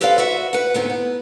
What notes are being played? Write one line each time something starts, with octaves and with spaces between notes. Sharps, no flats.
G4 A4 B4 C5 D5 F5
F#4 B4 E5 F#5
B4 F#5
D2 G#2 B3 C4 D#4
B3